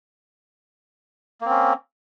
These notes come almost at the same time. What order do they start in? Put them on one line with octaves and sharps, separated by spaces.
A#3 C4 C#4